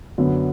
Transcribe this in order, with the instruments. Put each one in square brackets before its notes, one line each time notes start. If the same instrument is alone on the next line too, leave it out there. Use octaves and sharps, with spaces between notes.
[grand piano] F#2 D3 F#3 B3